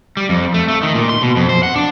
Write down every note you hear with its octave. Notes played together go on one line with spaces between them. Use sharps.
G3
F2
A3
A3
D#3
A#2
C6
B2
F2
C5
F#5
D4